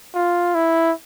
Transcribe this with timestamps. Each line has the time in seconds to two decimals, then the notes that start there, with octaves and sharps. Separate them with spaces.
0.14 F4
0.55 E4